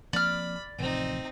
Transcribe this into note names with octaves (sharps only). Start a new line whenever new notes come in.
F3 A#3 C4 D5 B5 F6
A1 C3 F3 C4 D#4